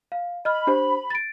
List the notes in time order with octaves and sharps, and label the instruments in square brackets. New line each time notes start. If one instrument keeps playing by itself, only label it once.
[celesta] F5
[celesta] D#5 F6 [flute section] B5
[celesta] D4 G4 C5
A6 D7